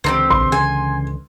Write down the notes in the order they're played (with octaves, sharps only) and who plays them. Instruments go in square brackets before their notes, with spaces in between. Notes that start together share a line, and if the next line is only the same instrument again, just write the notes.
[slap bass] C#2 D3 E3 [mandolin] C4 D#4 G4
[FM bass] A#1 [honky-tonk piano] C6
[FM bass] C#3 [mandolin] G#5